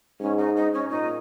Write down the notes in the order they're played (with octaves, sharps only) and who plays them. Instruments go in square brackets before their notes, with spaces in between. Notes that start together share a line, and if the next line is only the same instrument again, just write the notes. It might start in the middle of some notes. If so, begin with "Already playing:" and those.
[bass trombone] G#2 [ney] C#4
[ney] D#4
D#4
C#4
[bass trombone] A#2 [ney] D#4